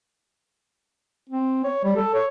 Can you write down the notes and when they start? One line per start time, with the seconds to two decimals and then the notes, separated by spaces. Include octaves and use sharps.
1.29 C4
1.64 C#5
1.84 G3
1.96 A4
2.14 C#5